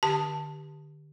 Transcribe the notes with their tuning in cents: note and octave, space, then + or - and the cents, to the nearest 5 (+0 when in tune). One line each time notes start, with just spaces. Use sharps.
D3 +25 G4 +0 A5 +10